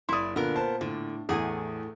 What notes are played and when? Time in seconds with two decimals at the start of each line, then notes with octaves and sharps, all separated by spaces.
0.09 F#1 E4 D5 C6 D#6
0.36 A#2 D3 B3 A#4
0.56 C5 A5
0.81 A2 D3
1.29 E2 A2 A3 G#4 F#5 G#5